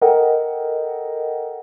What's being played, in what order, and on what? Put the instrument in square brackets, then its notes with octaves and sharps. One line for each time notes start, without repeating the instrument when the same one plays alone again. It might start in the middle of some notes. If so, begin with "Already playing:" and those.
[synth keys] A4 A#4 D#5 F#5 G5